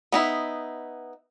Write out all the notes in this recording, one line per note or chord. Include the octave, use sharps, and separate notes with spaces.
B3 D#4 E4